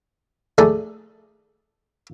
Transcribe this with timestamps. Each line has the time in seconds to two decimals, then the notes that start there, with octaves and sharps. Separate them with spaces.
0.58 A3 D#4 G#4 A4 D5